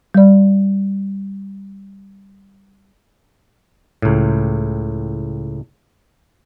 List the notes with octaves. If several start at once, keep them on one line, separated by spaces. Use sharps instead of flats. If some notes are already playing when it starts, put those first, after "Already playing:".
G3 D5
C#2 A2